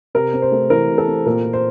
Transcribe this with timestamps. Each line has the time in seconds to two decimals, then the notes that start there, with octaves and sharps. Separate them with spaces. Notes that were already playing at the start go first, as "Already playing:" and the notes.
0.15 C3 A#4
0.33 C4
0.42 C5
0.52 A3
0.70 E3 A#4
0.89 C3
0.98 A4
1.07 C4
1.26 A#2 A#4
1.45 A#2
1.53 C5